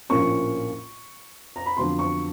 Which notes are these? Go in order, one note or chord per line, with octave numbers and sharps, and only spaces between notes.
A#1 A2 F3 A#3 C#4 C#6
A#5
B5
F2 D3 F#3 B3 C6
C#6